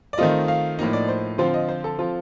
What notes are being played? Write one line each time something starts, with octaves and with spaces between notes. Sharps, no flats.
D5
D#3 A3 C4 F4 D#5
F5
A2 F3 A#3 D#4 D#5
D5
C5
D3 F3 C4 F4 C5
D#5
C5
A4
F3 C4 F4